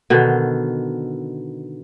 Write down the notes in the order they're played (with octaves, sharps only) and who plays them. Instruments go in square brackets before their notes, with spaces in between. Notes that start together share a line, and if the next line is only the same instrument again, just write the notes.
[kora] B2 D3 D#3